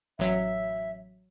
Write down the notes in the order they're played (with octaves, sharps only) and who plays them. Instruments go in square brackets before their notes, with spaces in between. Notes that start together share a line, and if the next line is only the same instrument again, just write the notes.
[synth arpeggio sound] A1 F#3 [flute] E5